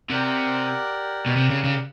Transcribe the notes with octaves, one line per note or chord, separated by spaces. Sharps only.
C3 G4 A#4 D5 F#5
B2
C3
C#3
C#3